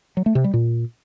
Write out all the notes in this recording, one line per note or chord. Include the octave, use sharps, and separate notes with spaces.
F#3
A3
C3
G3
A#2